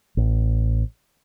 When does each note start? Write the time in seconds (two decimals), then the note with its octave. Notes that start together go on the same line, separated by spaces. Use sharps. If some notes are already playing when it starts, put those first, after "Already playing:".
0.17 A1